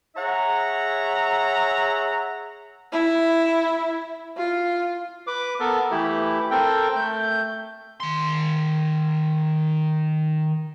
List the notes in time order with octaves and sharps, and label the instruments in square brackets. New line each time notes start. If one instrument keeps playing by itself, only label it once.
[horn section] G#4 C#5 E5 F#5 A#5
[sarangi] E4
F4
[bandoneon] B4 D6
B3 A4 A#4
E3 A3 E4 G4
C4 A4 A#4 G5
A3 G6
[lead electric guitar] D#3 C6